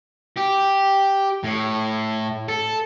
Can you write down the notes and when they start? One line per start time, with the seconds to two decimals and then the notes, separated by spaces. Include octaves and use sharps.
0.37 G4
1.44 A2
2.48 A4